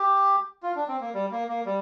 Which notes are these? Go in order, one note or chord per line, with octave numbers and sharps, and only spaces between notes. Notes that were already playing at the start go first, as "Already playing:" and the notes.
Already playing: G4
F4
D4
C4
A#3
G3
A#3
A#3
G3